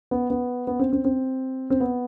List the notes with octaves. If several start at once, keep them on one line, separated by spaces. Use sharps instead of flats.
B3
B3
B3
C4
C4
C4
C4
B3